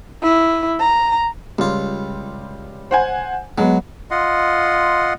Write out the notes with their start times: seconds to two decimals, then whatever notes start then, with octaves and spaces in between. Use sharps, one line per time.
0.23 E4
0.80 A#5
1.59 C#2 G3 F4
2.91 C5 F#5 G#5
3.58 F#3 G#3 B3
4.11 F4 D#5 F#5 C6